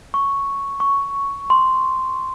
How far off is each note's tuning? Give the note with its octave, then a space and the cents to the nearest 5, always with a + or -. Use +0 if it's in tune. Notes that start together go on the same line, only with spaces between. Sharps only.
C#6 +0
C#6 +5
C6 -5